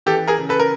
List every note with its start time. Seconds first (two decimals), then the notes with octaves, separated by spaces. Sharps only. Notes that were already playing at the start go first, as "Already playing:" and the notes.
0.06 E3 G4 A4
0.27 G#4 A#4
0.38 C#3
0.49 A4 B4
0.60 A#4